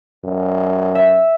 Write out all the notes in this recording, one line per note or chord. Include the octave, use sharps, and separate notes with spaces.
F#2
E5